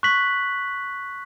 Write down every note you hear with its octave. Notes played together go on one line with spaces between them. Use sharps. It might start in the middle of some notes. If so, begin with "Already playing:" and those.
C#6 F#6 B6 F#7